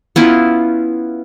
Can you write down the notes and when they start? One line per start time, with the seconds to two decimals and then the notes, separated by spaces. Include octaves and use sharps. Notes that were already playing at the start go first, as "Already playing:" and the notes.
0.16 B3 C#4 E4 F4